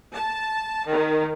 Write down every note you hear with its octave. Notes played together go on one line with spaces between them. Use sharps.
A5
D#3